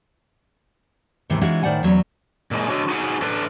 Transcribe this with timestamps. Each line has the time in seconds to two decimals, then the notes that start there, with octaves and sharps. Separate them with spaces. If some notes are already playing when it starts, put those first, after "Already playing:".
1.30 D#2 G#2 C3 D#3 E3
1.41 E3 G#3 C#4 D#4 F4 F#4
1.62 A2 D#3 C5 D5 F#5 G#5
1.83 E2 F#3 B3 C#4
2.51 A#2 G3 G#3
2.69 D3 F#3 F#4 D#5
2.89 D#4 F#4 G#4 F#5
3.22 A2 D4 A4 B4